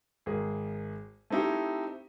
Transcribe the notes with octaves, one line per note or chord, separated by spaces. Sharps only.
G#1 G#4 A#4
A3 C4 D#4 E4 G4